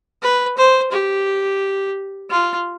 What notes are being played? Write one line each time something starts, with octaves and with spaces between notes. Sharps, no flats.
B4
C5
G4
F4